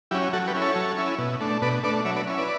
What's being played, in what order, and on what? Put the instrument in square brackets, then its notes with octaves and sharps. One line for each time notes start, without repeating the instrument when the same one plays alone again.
[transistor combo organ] F#3 C#4 E4 G4
F#3 F#4 A4
G4 B4
C#4 E4
A4 C#5
F#3
C#4 E4
B2
A3 D4
B2 B4 D5
A3 D4 B4 D5
F#3 C#5 E5
B4 D5
C#4 E4
B4 D5